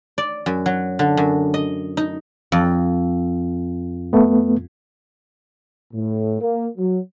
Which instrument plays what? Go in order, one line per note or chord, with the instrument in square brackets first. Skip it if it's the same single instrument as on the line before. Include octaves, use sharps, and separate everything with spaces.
[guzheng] D5
F#2
F#3
D3
F#2
D#5
D#4
F2
[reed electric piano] A3 B3
[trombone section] A2
A#3
F#3